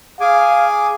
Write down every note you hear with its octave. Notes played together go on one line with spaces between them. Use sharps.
G#4 F5 G#5 D6